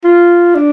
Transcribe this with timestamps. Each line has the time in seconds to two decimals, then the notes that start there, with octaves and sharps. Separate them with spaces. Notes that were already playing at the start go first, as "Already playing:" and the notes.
0.04 F4
0.55 D4